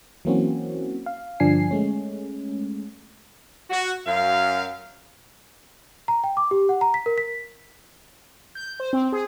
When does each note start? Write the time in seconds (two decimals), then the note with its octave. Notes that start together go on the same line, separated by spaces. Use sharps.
0.25 E3 F#3 A#3 C4 C#4 F#4
1.06 F5
1.40 G2 D3 F3 D4 G#5 C7
1.71 G#3 A3 C#4
3.70 F#4
4.07 F#2 F5
6.08 A#5
6.24 G5
6.37 D6
6.51 G4
6.69 F#5
6.81 A#5
6.94 B6
7.06 A#4
7.18 B6
8.55 G6
8.80 C5
8.93 C4
9.12 G#4